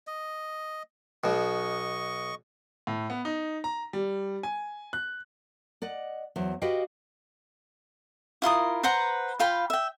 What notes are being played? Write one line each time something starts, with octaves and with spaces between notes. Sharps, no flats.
D#5
B1 B2 D#5 C#6
A2
B3
D#4
A#5
G3
G#5
F#6
D5 D#5 F#5
E2 F#3 C5
F#4 G4 B4 D#5 F5 G5
E4 F4 A#4 D#6
B4 C5 F#5 A#5
F4 F5 G5 B5
E5 G5